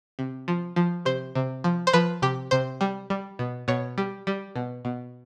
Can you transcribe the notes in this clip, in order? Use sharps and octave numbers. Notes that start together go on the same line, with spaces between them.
C3
F3
F3
C3 C5
C3
F3
C5
F3 B4
C3 G4
C3 C5
G3
G3
B2
B2 C#5
G3
G3
B2
B2